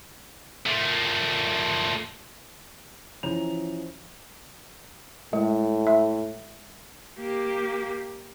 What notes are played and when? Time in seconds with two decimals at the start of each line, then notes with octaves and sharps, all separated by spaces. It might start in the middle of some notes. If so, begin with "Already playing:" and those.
0.66 A#2 A3
3.23 E3 F3 C#4 A#5 F7
5.33 A2 G#3
5.87 E5
7.19 A#3 G4